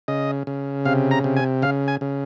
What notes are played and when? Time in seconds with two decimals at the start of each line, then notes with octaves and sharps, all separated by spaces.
0.08 C#3 D#5
0.47 C#3
0.85 C3 F5
1.11 A#5
1.24 C3
1.37 G#5
1.62 C#3 F5
1.88 G#5
2.01 C#3